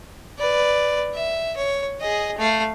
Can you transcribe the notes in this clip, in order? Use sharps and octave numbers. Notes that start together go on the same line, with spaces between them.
B4 D5
E5
C#5
G#4 D#5
A3 F5